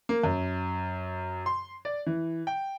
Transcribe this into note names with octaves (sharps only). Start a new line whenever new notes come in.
A#3
F#2
C6
D5
E3
G5